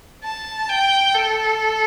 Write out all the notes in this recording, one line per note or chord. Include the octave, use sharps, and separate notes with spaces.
A5
G5
A4